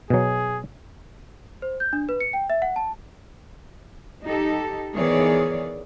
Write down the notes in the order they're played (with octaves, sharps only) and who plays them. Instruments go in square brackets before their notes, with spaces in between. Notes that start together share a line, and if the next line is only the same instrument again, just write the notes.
[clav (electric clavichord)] B2 F#3 [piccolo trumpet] G#4
[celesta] C5
G6
D4
B4
C#7
G5
E5
F#5
A5
[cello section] D#4 G4 A4
D#3 E3 B3 G#4 C#5 D5